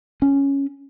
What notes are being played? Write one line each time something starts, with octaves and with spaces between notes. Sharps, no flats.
C#4